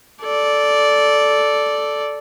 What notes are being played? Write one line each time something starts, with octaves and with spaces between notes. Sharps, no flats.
A4 D5